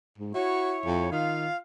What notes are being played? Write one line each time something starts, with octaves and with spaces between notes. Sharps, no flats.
G#2
E4 F#4 C#5
F2
D#3 F4 F5